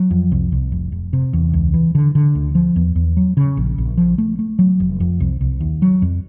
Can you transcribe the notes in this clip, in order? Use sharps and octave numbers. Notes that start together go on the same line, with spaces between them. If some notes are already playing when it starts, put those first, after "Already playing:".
Already playing: F#3
F2
C2
C2
F1
F1
C3
E2
C#2
E3
D3
D3
D2
F3
E2
E2
F#3
C#3
A#1
A#1
F3
A3
A3
F#3
F1
F2
C2
C2
D#2
F#3
F2